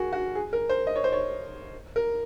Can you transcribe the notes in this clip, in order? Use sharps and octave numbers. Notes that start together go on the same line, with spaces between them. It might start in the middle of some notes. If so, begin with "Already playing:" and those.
Already playing: F#4 G#4 A#4
F#4
G#4
A#4
C5
D#5
C#5
C5
C#5
A#4